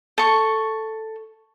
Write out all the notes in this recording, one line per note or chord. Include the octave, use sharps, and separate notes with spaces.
A4 C#6